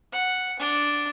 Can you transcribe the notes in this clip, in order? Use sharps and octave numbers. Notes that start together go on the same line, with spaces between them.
F#5
D4